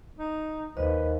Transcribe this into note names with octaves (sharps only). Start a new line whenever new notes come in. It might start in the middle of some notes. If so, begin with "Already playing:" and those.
D#4
D#2 B4 C5 D#5